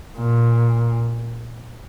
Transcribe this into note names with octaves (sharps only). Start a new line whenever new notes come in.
A#2